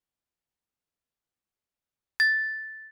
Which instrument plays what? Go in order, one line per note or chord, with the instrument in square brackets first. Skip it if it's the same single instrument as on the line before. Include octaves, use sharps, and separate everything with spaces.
[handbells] A6